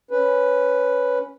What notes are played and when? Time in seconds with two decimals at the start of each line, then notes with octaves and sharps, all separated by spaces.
0.11 C#4 B4